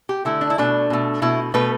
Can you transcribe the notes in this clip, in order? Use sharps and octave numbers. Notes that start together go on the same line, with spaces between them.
G4
D3 A3 E4
D4
E4
B2 A3 D4
B2 A3
B2 A3 E4
B2 A3 B4